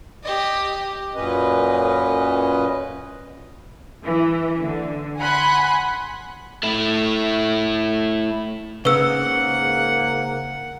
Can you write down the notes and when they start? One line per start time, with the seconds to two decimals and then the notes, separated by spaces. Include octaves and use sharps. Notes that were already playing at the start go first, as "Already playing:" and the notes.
0.24 G4 D#5
1.15 F#2 A#2 C#4 B4 D#5
4.04 E3
4.59 D3
5.19 F#5 G#5 B5 C6 F#6
6.63 A3 E4
8.85 G#2 C#3 A#3 B4 F#5 E6